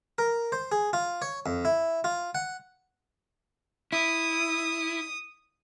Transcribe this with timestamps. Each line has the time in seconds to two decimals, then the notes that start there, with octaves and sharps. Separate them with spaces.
0.18 A#4
0.52 C5
0.72 G#4
0.93 F4
1.22 C#5
1.46 F2
1.65 E4
2.04 F4
2.35 F#5
3.92 E4 D#6